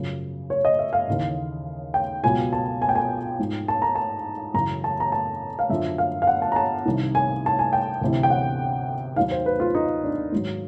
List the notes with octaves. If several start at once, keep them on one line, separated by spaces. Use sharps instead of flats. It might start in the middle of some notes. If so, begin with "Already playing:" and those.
Already playing: F#2 C#3 F3
C#5
D#5
E5
F5
D#2 C#3 E3
G5
C#2 B2 F#3 G#5
A5
G#5
G5
G#5
G#2 F3
A5
A#5
A5
F#2 C#3 E3 A#5
A5
A#5
A5
F5
F#2 D3 F3 E5
F5
F5
F#5
A5
A#5
A5
C2 C3 D#3
G#5
A5
G#5
G5
D2 C3 E3
G5
F#5
D#2 D#3 F#3 F5
C5
B4
F4
D#4
D4
G#2 D#3 F#3